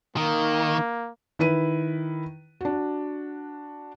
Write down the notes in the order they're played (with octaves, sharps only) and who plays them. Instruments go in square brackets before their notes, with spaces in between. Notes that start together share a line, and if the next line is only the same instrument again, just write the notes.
[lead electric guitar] D#3 [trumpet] A#3
[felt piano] D#3 E4 B4 D#7
D4 F#4